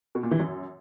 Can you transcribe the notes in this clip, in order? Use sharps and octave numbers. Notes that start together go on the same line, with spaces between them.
B2
A#2
E3
F#2